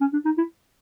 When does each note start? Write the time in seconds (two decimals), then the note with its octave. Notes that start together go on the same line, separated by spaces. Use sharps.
0.01 C#4
0.13 D4
0.25 D#4
0.38 E4